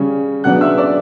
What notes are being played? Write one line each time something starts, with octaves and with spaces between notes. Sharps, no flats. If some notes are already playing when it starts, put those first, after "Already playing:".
Already playing: C#3 G3 C#4
C#3 F#3 B3 D4 F#5 F#6
E5 E6
D5 D6